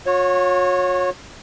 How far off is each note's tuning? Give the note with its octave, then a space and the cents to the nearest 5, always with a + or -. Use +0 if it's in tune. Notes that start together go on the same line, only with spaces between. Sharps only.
F#4 -45 C#5 -15